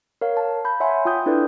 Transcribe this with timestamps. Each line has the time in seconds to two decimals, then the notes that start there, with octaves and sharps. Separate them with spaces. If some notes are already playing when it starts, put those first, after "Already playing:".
0.21 A#4 C#5 F5
0.37 A5
0.65 B5 G6
0.80 C#5 E5 F#5 G#5 C6
1.05 F4 G5 D#6 G6
1.26 D4 E4 A4 B4 D5